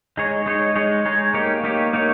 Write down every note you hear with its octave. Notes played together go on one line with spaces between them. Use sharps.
G#3 D#4 G#4 C#5
G#3 D#4 G#4 C#5
G#3 D#4 G#4 C#5
G#3 D#4 G#4 C#5
A#3 D#4 G4 C#5
A#3 D#4 G4 C#5
A#3 D#4 G4 C#5